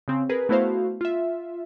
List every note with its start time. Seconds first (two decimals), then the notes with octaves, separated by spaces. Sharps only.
0.08 C#3 C4
0.29 G#4 A#4 B4
0.49 A3 B3 E4 F#4 C5 F5
1.01 F4 E5